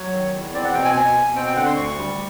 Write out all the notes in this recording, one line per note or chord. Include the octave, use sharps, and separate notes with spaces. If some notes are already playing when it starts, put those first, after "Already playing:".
Already playing: F#3 C#5
D#3
E2
C4 D5
F#5
B2 G5
G#5
B2 G#5
B2
C4 G5
G5
D3 F#5
C6
D2 C#6
G3